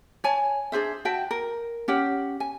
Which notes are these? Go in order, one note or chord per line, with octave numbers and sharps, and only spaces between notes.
C#5 G#5 A5
D4 G#4 C5 E5
F#4 E5 G5 A5
A#4
C#4 G4 F#5
G#5